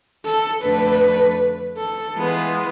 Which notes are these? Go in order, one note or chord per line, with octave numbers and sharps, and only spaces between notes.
A4
F2 D3 A3 D4 A4 B4
A4
E3 G#3 B3 F4